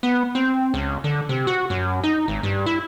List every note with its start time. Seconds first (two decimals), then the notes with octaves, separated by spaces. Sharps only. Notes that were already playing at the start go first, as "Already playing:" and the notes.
0.03 B3
0.35 C4
0.74 C#2
1.04 D3
1.29 C3
1.47 F#4
1.70 F#2
2.04 D#4
2.28 G#1
2.43 G2
2.66 E4